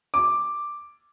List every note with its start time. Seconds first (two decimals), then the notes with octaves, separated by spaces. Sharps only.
0.14 D6